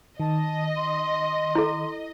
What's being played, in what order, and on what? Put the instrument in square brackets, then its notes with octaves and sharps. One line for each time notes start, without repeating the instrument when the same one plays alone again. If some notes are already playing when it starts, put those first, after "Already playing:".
[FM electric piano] D#3 [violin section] D#5 [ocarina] A5
[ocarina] C6
[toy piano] E4 A4